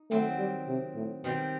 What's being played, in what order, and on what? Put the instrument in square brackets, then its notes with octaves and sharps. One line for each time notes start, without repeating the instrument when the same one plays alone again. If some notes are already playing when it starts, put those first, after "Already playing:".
Already playing: [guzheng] D#4
[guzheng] D#3 F#3 C4 [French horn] A3
[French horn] G3
C3
A2
[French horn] B2 [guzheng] D#3 G3 C4